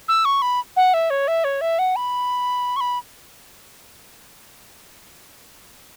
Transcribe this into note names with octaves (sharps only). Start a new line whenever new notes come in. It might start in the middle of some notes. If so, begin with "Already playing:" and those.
E6
C#6
B5
F#5
E5
C#5
E5
C#5
E5
F#5
B5
C#6
B5